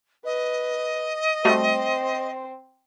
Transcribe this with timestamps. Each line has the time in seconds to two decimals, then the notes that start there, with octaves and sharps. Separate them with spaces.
0.25 B4 D#5
1.45 G3 A3 C4 F#4 C5